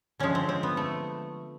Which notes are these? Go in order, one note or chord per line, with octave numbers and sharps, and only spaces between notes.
D3 F3 G#3 C#4
C4
C4
B3
A3